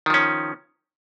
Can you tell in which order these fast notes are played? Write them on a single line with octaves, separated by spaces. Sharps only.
D#3 F3 C#4